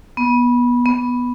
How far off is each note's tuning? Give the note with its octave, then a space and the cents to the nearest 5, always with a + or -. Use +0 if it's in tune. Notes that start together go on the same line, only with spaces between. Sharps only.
B3 -20
B3 -5